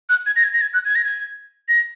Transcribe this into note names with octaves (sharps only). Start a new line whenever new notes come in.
F#6
G#6
A#6
G#6
A#6
G#6
F#6
G#6
A#6
G#6
A#6